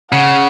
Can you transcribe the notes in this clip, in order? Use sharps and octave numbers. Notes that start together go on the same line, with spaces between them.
C#3 F#5